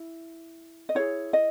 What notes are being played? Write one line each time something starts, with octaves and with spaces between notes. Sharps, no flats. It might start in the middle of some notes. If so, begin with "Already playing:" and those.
Already playing: E4
D#5
E4 G#4 C#5
D#5